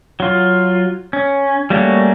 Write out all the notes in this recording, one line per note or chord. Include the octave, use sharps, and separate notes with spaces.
F#3 F4
C#4
G3 A3 A#3 C#4 F#4